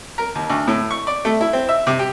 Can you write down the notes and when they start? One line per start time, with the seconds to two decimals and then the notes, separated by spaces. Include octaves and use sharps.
0.18 A#4
0.35 D#2
0.50 D2
0.68 A2
0.91 C#6
1.07 D5
1.25 A3
1.41 E4
1.53 C4
1.69 E5
1.87 C3
1.99 G4